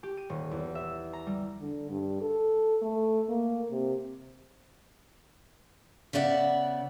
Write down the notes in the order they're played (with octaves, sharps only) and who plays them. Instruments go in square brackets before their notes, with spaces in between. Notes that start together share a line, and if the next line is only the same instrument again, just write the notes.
[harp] G4
D#7
D#1
E2
E5
A#5
G3
[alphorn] D3
G2
A4
A3
A#3
C3
[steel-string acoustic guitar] C#3 B3 D5 E5 F#5